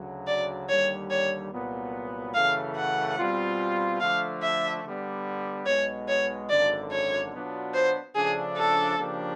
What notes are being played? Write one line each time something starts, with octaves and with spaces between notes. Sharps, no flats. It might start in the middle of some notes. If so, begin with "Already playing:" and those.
Already playing: D2 C#3 F#3
D5
D#2 D3 G3 C#5
C#5
C2 A#2 F#3 B3
F#2 C#3 E3 A3 F5
F#5
B2 G3 C4 F4
D3 F3 A3 F5
E5
D3 G3 B3
B1 B2 G#3 C#5
C#5
G#1 F#2 D3 D5
C#5
B2 F#3 B3 D4 F4
C5
C#3 F3 A3 D4 G#4
A4
C#3 F3 A#3 D4 G4